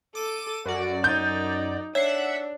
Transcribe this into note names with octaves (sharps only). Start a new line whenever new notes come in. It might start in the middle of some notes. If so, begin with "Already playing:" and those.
A4 D6 D#7
F#2 F#4 D5
D#4 G6
D4 C#5 E5 F#5 C7